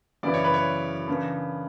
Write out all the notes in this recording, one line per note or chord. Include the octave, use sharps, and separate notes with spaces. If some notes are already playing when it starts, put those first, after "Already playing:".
F#2 C#3 E3 B3 E4 D5
C#5
B4
C#5
C#3 E3 B3 D4